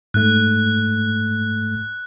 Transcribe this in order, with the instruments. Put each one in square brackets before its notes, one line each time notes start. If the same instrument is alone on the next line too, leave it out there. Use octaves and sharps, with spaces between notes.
[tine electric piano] G#2 A3 [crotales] F#6